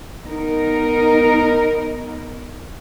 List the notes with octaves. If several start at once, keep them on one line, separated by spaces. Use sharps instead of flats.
B3 D#4 A#4